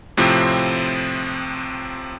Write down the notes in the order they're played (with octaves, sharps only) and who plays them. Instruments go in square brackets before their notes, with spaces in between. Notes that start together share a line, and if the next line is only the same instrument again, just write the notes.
[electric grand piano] A2 C3 F3 C4